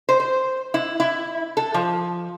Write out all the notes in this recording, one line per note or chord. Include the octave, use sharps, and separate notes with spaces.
C5
C5
E4
E4
A4
F3